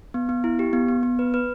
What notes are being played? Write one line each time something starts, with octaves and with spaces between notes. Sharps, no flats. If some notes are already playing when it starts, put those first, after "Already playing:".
B3
B3
E4
G4
B3
B3
B3
B4
B4